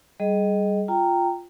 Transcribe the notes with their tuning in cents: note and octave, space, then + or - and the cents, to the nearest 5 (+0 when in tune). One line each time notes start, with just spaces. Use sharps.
G3 -5 G#4 +20 D#5 +0
F4 +0 G5 +0 A#5 -15